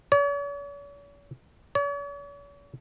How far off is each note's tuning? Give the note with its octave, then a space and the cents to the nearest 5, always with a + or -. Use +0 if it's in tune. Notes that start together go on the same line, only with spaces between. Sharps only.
C#5 +45
C#5 +45